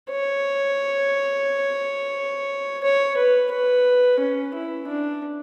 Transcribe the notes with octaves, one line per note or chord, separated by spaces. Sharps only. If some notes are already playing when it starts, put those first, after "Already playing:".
C#5
C#5
B4
B4
C#4
E4
D4